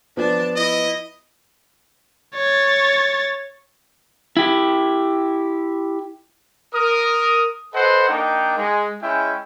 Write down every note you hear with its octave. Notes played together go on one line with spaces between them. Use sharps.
F3 B3 D4 A5
E4 D#5
C#5 A6
E4 G4
A#4 D#6
A4 B4 C5 D#5 F#5
A#3 D4 D#4 G5
G#3
G#3 C#4 E4 E5 G5